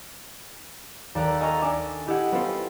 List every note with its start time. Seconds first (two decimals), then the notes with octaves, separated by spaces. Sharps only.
1.15 D#2 A4 D5 A#5 F#6 D7
1.40 A4 D#5 G#5 A#5 C#6 F6
1.61 D4 A4 E5 G#5 D6
2.07 E4 G4 D#5 E5 F#5 G#6
2.32 B3 C#4 F4 G4 A4 C5